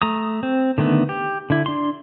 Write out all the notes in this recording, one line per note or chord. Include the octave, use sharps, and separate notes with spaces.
A3 A#5 D#6
C4
D3 D#3 A3 B3
G4
D3 E4
D4 C6